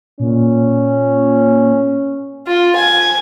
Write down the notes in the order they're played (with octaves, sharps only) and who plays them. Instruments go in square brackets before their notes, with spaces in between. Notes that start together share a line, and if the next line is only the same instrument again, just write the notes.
[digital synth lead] A#2 [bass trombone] C#4
[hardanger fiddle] F4
G#5